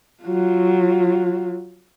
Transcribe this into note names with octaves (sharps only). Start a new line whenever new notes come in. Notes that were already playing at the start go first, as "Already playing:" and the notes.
F#3 F4